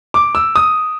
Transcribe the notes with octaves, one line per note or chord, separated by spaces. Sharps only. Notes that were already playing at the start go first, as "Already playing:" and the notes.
D6
E6
D#6